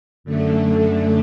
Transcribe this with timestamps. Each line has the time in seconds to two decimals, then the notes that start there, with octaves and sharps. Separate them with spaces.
0.24 F#2 D3 A3